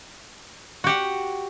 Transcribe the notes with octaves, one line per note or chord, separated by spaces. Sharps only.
F#4 G4 F#5